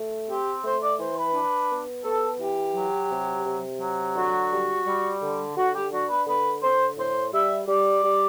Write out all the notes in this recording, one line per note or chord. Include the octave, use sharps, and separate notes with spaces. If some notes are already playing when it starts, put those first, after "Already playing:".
Already playing: A3
C4 G4
A3 C5
D5
E3 C5
B4
D4
B3
B3 A4
E3 G4
F#3
C3
C3
F#3
D3 F#4
G3
G3
D3
D3 F#4
G4
D4 F#4
B4
D3 B4
D3 C5
A2 C5
G3 E5
G3 D5
G3